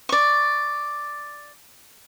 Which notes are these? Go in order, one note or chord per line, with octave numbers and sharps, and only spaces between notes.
D5 C#6